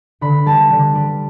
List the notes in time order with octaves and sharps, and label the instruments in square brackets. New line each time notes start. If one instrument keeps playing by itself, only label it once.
[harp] D3 B5
G3 A5
D3
G3